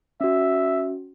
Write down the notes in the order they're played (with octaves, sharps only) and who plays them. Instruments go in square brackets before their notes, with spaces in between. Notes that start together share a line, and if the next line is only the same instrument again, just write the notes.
[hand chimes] C#4 F#4 [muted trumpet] E5